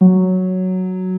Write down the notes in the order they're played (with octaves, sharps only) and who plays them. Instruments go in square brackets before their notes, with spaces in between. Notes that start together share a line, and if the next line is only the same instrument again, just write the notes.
[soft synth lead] F#3